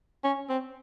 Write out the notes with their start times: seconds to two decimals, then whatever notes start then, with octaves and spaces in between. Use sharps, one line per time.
0.24 C#4
0.50 C4